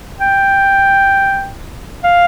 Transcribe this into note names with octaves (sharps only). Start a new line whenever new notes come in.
G5
F5